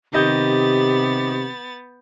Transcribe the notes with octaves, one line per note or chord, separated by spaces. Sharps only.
C3 D#3 B3 G4 D#5 G6 A6